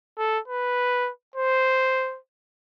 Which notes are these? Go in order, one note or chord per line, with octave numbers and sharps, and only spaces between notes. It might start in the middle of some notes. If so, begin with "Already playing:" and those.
A4
B4
C5